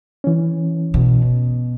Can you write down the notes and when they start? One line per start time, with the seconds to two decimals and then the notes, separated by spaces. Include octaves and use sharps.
0.24 E3 C#4
0.94 B2